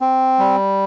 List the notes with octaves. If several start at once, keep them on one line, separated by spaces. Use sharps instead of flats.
C4
G3